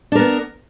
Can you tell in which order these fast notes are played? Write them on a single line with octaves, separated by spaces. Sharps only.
D4 A#4 B3